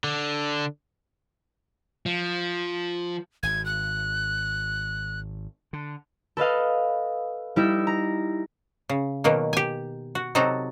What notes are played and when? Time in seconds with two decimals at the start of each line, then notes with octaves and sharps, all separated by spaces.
0.04 D3
2.06 F3
3.43 G#1 G#6
3.66 F#6
5.73 D3
6.37 A4 B4 D#5 F5
7.56 G3 D#4 E4 E5
7.87 A#5
8.89 C#3
9.24 B2 D#3 F#3 A#3
9.53 G4 G#5
10.15 F#4
10.35 C3 F#3 D#4 F#4 A4